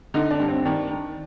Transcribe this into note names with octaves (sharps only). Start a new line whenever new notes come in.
D3 D#4
D4
G2
C4
D#3 D4
D#3